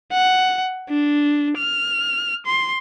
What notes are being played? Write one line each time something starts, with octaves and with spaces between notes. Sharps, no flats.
F#5
D4
F6
C6